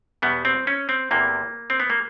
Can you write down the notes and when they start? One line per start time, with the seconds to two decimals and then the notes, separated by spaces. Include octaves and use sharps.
0.22 E2 B2 G3 B3
0.45 C4
0.67 C#4
0.89 C4
1.11 E2 C3 E3 A#3
1.70 C4
1.80 B3
1.90 A#3